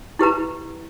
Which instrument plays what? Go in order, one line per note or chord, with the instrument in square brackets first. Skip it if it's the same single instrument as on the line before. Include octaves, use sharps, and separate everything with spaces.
[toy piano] E4 G4 B4 A#5